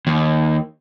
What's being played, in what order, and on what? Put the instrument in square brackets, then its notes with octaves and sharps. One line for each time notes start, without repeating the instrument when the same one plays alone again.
[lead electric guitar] D#2